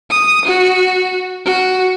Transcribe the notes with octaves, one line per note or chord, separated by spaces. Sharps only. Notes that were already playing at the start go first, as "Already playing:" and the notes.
D#6
F#4
F#4